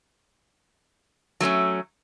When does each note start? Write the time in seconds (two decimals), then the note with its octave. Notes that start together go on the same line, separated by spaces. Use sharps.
1.40 F#3 A3 C4 C#4